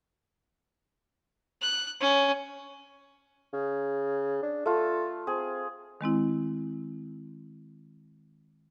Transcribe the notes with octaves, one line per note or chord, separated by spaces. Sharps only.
F#6
C#4
C#3
D4
A3 F4 A4
C4 G#4
D#3 G#3 C4 E4